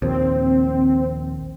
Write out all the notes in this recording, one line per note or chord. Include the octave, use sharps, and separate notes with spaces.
A#1 D#2 C4